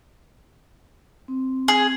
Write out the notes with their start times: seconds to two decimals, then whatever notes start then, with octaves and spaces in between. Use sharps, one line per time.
1.28 C4
1.68 G#4